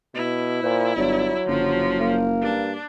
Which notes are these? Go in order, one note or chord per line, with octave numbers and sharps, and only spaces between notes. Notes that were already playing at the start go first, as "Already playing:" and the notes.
B2 E4
A#2 C5
G1 F#3 D5
F#1 D3 F3
A#3
G2 D4